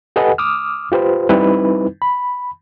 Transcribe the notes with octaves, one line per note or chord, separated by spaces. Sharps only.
G4 A4 B4 D#5 F#5 G#5
D6 D#6 F6
F4 G4 B4 C5
G3 C4 D#4 E4 B4
B5